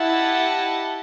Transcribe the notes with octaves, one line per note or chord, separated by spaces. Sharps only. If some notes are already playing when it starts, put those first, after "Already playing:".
Already playing: E4 G4 D#5 F#5 A5